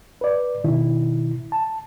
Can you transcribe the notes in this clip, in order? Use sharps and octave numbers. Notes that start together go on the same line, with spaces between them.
B4 D5
B2 D#3 E4
A5